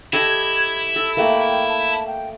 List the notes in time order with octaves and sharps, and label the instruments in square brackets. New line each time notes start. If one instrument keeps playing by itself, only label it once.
[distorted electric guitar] E4 [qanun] G4 A4 D#5 [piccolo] G#6
[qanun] A4 [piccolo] E6
[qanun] A3 A#3 [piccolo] G5
[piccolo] A5
G5